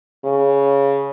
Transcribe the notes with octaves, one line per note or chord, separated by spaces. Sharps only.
C#3